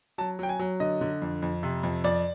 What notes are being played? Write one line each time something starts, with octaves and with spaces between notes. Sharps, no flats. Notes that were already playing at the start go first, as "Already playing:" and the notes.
F#3 A5
F#3 G5
G#5
F#3
D3 D#5
D3
F2
F2
C3
F2
F2 D5